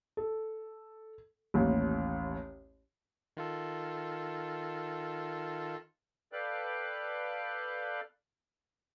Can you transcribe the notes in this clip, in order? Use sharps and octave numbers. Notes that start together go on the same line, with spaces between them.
A4
A1 D#2
D#3 F4 A4
A4 B4 D5 F5 G5 F#6